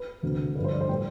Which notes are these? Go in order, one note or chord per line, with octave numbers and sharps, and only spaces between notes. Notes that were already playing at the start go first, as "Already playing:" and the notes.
Already playing: B4
E1 D2 C3
G1 G2 F3 A3 B4
C5
D5
C5
A2 G3 G5